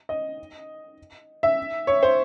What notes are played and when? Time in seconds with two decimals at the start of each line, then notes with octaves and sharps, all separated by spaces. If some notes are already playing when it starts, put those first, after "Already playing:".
0.09 D#5
1.43 E5
1.87 C#5
2.03 C5